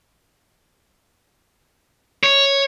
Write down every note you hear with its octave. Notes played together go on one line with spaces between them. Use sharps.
C#5